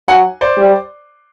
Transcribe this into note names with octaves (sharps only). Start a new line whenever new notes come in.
F#3 F#5 G#5
C5 D5
G3